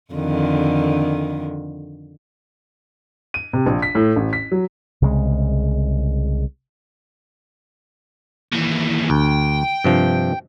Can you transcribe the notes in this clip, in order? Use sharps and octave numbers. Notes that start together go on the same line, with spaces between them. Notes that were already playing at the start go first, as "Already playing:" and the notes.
F2 D3 D#3
D#7
C3
A#1
B6
A2
A1
B6
F#3
C2 C#3 G3 G#3
D#2 E3
D2 G5
G2 C3 F3